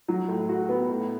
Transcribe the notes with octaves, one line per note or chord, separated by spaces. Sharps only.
F#3
A2
F#4
B3
A2